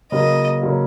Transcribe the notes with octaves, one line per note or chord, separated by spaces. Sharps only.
C#3 F#3 A#3 D#5
C#3 F#3 A#3